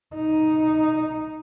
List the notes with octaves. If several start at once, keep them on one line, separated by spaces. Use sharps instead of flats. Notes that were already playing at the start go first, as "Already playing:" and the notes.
D#4